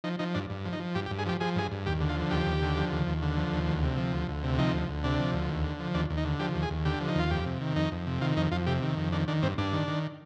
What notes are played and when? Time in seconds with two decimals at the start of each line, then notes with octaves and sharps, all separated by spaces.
0.04 F3 D#4
0.19 F3 D#4
0.35 G2 D4
0.50 G2
0.65 F3
0.73 D#4
0.80 F3
0.95 G2 G4
1.06 G4
1.11 G2
1.18 G#4
1.26 F3 G4
1.40 F3 G#4
1.56 G2 G#4
1.71 G2
1.86 D#2 G4
2.01 D3
2.09 F4
2.16 F3
2.31 D#2 G4
2.46 D#2
2.62 D3
2.77 F3
2.92 D#2
3.07 D#2
3.22 D3
3.37 F3
3.52 D#2
3.67 D2
3.83 C3
3.97 F3
4.13 D2
4.29 D2
4.43 C3
4.58 F3 D#4
4.74 D2
4.89 D2
5.03 C3 D4
5.20 F3
5.34 D2
5.49 D#2
5.64 D3
5.79 F3
5.94 D#2 D4
6.10 D#2
6.17 D#4
6.25 D3
6.40 F3 G4
6.55 D#2
6.62 G#4
6.70 D#2
6.85 D3 G4
7.00 F3
7.08 D#4
7.16 D#2 F4
7.31 F2 G4
7.46 C3
7.61 D#3
7.76 F2 D#4
7.91 F2
8.07 C3
8.21 D#3 F4
8.36 F2 D#4
8.51 F2 F4
8.66 C3 G4
8.82 D#3
8.97 F2
9.12 D#3 D4
9.28 D#3 D4
9.43 G2 C4
9.58 G2 D4
9.73 D#3
9.88 D#3